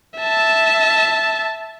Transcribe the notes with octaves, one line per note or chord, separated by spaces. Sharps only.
E5 A5